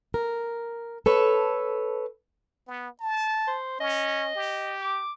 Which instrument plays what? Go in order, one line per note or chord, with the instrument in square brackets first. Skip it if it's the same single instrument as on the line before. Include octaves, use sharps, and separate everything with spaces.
[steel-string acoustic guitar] A#4
A4 B4 C#5
[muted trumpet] B3
A5
[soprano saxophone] C5
[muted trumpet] C#4 [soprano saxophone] D#5
[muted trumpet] G4
[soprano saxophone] D6